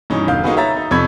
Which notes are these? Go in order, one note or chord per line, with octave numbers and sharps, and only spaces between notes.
G2 B2 E3 C#4 D#4
E1 D3 F5 G6
A#3 D#4 F4 F#4 G#4 B4
C#5 E5 A#5 A6
D#4
F2 C3 B5 C#6 G#6